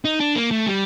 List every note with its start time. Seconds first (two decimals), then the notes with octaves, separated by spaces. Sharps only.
0.05 D#4
0.20 D4
0.36 A#3
0.51 A3
0.66 G3